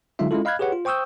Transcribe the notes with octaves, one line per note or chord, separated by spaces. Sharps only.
D3 F#3 G#3 D#4 F4 E5
G#3 C#4 E4 F4 A4
D#5 F5 B5 F6 F#6 G#6
G4 G#4 B4 C#5 F#5
F4
C5 G5 C#6 D#6 E6 G6